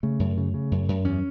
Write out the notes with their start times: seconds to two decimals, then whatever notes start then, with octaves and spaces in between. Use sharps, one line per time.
0.03 C#3 A3
0.19 F#2
0.37 C#3
0.54 C#3
0.71 F#2
0.89 F#2
1.04 E2 C#4